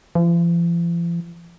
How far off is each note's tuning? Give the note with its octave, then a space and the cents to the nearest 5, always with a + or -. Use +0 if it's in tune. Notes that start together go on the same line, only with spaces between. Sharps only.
F3 -45